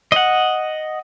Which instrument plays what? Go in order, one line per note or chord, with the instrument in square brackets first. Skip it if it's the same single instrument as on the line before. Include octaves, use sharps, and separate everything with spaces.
[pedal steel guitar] D#5 F#5